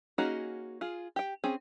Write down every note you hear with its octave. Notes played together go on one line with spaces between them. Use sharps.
A#3 C#4 D#4 F#4 G#4
F4 G#4
G4 G5
C4 C#4 G#4